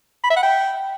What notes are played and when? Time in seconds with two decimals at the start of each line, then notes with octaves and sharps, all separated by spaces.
0.24 B5
0.30 E5
0.36 F#5
0.43 G5